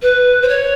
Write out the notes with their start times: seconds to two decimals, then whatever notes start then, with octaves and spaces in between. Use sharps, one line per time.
0.02 B4
0.42 C5
0.48 C#5